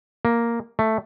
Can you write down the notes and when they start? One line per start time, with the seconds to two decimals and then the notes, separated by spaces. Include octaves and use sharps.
0.25 A#3
0.79 A3